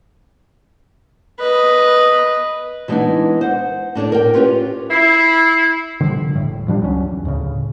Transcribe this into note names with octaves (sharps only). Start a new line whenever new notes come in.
B4 D#5
E3 G3 G#3 B3 D4 D#4
C5 F#5
A2 D4 A4 C#5
A#4 G5
C#4 F4 G4 B4 C#5
E4 C7
D3 F3 G3
E1 A2
F3 G3 D4
C#2 F#3 C4 C#4
E2
D2 A2 C#3